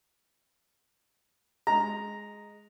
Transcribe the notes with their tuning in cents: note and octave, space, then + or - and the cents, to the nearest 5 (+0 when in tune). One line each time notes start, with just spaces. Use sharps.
G#3 +0 A#5 +0